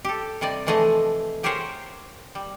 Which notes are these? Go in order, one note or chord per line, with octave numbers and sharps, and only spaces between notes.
G4 A4
C3 G3 D5 D#5
E3 F3 A3 G#4 D#5
F#3 G4 G#4 A#4 C5 C#5
G3